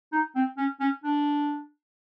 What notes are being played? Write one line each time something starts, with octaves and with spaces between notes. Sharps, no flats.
D#4
C4
C#4
C#4
D4